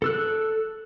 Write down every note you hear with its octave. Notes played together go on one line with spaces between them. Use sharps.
A4 E6 F#6